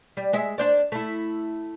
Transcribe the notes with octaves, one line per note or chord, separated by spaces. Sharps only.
G3
G#3 E5
D4 C5 D5
A3 E4